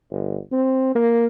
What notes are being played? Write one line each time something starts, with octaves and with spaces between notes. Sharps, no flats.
G1
C4
A#3